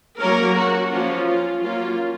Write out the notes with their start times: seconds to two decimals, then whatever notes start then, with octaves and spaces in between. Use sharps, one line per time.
0.19 F#3 A#3 C#4 A#4
0.56 F#4
0.91 F3 A#3 C#4 F4
1.26 F4
1.62 F#3 A#3 C#4 F4